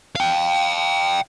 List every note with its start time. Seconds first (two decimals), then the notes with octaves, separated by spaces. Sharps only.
0.16 F5 G5